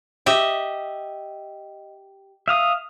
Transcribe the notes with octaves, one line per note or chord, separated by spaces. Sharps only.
G4 D#5 E5
E5 F5 D#6